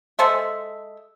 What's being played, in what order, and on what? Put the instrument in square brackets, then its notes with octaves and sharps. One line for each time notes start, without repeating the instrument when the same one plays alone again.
[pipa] G#3 A4 C5 E5